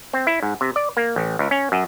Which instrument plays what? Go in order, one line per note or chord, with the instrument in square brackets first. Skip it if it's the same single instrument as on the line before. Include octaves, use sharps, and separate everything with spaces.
[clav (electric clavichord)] C4
E4
G#2
C3
D5
A#3
A1
C#2
C#4
F#2